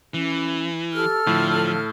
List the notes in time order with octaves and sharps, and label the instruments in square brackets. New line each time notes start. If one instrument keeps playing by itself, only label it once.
[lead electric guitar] E3 [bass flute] C#4
[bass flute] G4 [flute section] A4 F6
[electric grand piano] A2 [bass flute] D3 [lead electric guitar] F3